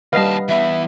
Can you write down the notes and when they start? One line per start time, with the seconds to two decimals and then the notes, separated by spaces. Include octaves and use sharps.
0.13 D#2 G3 B4 D#5 F5 F#5 A5 A#6
0.49 E3 B3 E5